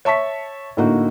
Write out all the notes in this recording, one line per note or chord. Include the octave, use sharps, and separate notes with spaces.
C#5 E5 A5 C#6 B6
A2 D3 A#3 D#4 F#4